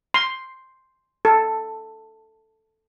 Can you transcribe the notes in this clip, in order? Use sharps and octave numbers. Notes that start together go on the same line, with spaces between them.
C6
A4